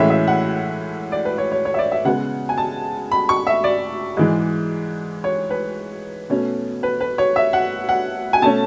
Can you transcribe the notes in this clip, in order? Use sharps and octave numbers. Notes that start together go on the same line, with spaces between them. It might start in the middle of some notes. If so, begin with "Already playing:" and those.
Already playing: A2 E3 G#3 C#4 E5
E5
F#5
D5
B4
C#5
C#5
C#5
E5
D5
E5
C#3 G#3 B3 F#5
G#5
A5
B5
C#6
E5
D5
G#2 E3 G#3
C#5
B4
B2 A3 C#4
B4
B4
C#5
E5
F#5
F#5
G#5
B2 A3 C#4 A5